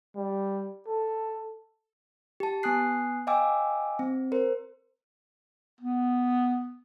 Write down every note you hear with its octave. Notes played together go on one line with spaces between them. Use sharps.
G3
A4
G4 A5
B3 G#5 D#6 F#6 C7
D#5 F5 G5 G#5 D6 E6
C4
A#4 C5
B3